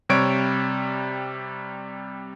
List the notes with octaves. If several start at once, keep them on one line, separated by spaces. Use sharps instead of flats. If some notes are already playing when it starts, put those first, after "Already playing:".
C3 G3 C#5 D7